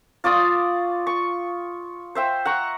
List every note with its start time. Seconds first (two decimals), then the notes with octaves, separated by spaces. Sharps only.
0.24 F4 D5 C#6 D#6
1.07 C#6
2.15 C5 E5 G5
2.45 F#5 A#5 C#6